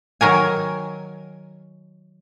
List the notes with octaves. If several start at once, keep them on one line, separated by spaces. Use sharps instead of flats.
D#3 F#3 A#4 G#5